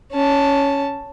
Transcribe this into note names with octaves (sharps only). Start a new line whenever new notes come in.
C#4 A5